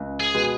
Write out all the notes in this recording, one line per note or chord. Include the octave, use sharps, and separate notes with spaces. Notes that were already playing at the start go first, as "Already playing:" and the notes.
Already playing: C#2
G#4
B2 G#3 B3